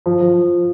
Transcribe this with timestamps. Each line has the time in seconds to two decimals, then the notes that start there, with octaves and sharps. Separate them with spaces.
0.06 F3
0.21 F3